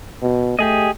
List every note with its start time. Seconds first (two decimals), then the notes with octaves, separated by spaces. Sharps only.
0.22 B2
0.59 A3 G4 G#4 D#5